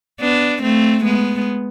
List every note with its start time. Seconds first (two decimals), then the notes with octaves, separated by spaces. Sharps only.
0.21 B3 D4
0.63 A3 C4
1.05 G#3 B3